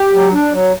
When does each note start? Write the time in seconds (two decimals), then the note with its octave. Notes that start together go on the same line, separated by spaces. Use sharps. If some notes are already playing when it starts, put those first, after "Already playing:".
Already playing: G4
0.13 F#3
0.33 D4
0.52 F#3